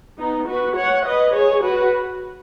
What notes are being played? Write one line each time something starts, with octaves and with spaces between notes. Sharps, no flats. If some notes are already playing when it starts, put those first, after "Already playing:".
B3 D#4
F#4 B4
C#5 F#5
B4 D#5
G#4 C#5
F#4 B4